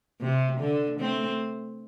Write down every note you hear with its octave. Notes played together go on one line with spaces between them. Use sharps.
C3
D3
A3 C4